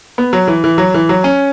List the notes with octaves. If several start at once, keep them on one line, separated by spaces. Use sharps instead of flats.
B3
F#3
E3
E3
F#3
E3
F#3
C#4